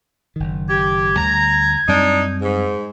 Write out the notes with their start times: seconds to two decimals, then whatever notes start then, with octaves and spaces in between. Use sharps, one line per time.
0.36 F#1 D#3
0.69 G4 G#6
1.16 D2 D3 G3 A#5
1.88 F#2 G3 C4 D4 D#4
2.42 G#2